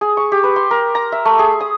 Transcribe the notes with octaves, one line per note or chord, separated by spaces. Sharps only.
G#4
C#6
G4
B4
C6
A#4
A#5
E5
A3
G#4
D#6